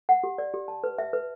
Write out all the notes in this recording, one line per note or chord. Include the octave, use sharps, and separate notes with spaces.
F#5
G4
D5
G4
A5
B4
E5
B4